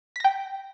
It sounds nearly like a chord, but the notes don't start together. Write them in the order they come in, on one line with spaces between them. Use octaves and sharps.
B6 A#6 G5